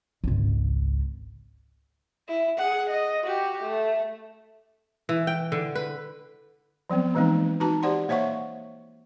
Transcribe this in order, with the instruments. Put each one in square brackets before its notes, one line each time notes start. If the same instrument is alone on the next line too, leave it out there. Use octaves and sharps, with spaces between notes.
[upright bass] G#1 C#2
[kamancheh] E4
G#4 F#5
D#5
F#4 G4
A3
[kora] E3
G5
D3
B4
[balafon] F3 F#3 B3 C4
E3 G#3 A#3 C4 D#4
D#4 F#4 B4 A5 A#5
G4 C5 D5 F#5 C6
A#3 C5 C#5 E5 F#5 C#6